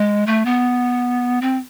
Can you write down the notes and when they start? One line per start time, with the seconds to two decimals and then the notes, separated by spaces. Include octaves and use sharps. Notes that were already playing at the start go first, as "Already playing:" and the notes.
Already playing: G#3
0.27 A3
0.45 B3
1.42 C4